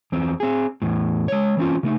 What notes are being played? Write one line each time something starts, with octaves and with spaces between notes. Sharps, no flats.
E2 C4
C4 G#4
E2 A2
G#3 C#5
E3 C4 C#4 F4
C#3 A3 D#4